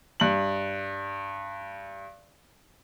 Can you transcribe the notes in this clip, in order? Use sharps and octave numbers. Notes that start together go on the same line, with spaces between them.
G2 F#7